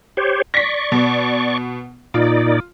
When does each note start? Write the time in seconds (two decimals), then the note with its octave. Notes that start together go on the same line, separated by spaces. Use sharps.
0.17 G4 C5 C#5
0.54 D5 C#6 A#6 B6
0.92 B2
2.14 A#2 D#4 F4 D5